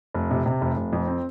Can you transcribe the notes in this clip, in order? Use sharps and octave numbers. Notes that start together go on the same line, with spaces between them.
F1
C3
C3
F1
F1
F2
C4